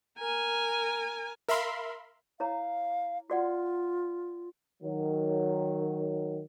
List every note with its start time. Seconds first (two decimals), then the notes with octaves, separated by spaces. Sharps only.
0.19 A#4 G#5
1.49 A#4 E5 F5 B5 C6
2.40 E4 C#5 F5 A#5
3.30 F4 F#4 D5 F#5
4.83 D#3 F#3